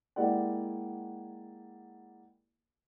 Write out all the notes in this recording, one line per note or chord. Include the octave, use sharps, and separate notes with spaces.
G#3 A#3 E4 G4 D5 F#5